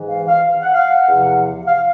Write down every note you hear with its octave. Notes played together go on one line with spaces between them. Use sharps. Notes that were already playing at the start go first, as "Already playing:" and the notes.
Already playing: G#2 E3
F5
F5
F#5
F5
F#5
E2 C3 F3
F5